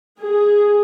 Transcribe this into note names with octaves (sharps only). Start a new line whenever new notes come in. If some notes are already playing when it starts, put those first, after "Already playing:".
G#4